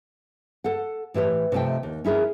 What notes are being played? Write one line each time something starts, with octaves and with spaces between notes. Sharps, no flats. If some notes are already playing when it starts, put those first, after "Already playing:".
A4 F#5
A2 E3 G4 C#5
C3 F3 A3 D#5 G5
D#2
C#4 E4 G#4 A#4